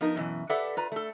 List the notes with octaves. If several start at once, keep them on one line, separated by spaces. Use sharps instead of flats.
F3 B3 D#4 A#4
F#2 B2 E3
G4 A4 B4 D5 E5 F#5
F4 B4 A#5
A3 A4